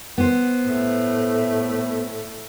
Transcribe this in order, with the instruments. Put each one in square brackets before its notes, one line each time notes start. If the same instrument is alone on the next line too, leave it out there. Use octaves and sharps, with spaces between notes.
[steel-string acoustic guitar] B3 C5
[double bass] A2 A3